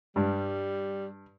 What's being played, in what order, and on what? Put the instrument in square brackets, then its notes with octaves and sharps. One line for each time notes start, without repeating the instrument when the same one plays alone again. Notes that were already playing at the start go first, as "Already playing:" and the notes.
[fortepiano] G2 [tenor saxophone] G3